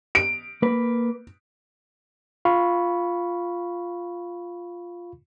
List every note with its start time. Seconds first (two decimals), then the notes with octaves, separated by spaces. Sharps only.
0.15 D7
0.62 A#3 B4
2.45 F4 F5 B5 C#6